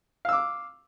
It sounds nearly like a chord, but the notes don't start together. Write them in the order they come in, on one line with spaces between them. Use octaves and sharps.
F5 E6 D6